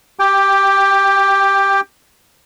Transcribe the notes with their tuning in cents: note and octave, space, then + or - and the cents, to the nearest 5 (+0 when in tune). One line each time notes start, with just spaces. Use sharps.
G4 +0 G5 +15